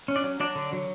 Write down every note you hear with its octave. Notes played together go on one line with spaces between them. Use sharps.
C#4
D4 D5
F#3
F#3 D4 D5
D3
F#3